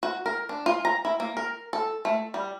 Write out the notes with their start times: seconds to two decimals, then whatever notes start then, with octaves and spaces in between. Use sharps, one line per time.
0.03 F#4
0.26 A#4
0.49 D4
0.66 F4
0.85 A#5
1.05 E4
1.20 A#3
1.37 A#4
1.73 A4
2.05 A3
2.34 G3